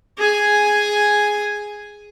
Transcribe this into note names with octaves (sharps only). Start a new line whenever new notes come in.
G#4 G#5